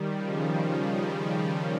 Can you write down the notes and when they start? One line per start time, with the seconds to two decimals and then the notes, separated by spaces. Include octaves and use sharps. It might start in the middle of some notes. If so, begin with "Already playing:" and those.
Already playing: D#3 G3
0.16 C#3 F3